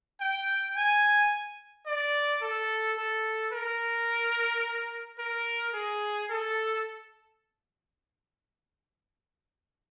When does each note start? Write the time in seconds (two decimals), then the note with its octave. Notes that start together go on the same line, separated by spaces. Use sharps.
0.21 G5
0.76 G#5
1.87 D5
2.42 A4
2.97 A4
3.52 A#4
5.19 A#4
5.74 G#4
6.30 A4